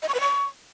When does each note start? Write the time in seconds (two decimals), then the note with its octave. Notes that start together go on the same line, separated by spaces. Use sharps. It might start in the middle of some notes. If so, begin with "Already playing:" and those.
0.03 D#5
0.08 C#6
0.14 B4
0.20 C#6